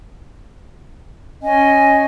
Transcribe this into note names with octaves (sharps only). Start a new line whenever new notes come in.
C#4 D#5 G#5